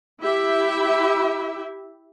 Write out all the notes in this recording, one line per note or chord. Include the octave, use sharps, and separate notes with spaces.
E4 G4 E5